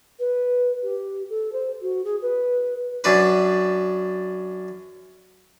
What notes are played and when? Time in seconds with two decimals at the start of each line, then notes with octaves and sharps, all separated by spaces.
0.19 B4
0.83 G4
1.29 A4
1.53 C5
1.82 F#4
2.05 G#4
2.22 B4
3.04 F#2 D4 B4